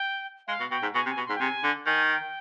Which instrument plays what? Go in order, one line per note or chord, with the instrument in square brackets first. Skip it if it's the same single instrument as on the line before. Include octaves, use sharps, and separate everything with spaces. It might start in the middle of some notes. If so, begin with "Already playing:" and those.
Already playing: [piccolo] G5
[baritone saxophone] G#3 [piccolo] F5
[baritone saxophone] B2
[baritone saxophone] B2 [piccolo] G5
[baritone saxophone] G#2
[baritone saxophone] B2 [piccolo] G#5
[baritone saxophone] C3
[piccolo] G#5
[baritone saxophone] B2
[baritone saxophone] G#2 [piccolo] C6
[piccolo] G5
[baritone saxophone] C3 [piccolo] G#5
[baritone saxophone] D3
[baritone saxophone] D#3 [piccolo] G#5
[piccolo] G5